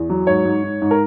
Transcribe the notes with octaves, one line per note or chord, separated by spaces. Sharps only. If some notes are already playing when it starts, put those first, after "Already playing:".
Already playing: E2
F#3
G#2 C#5
G#2
G#2
G#2
A#4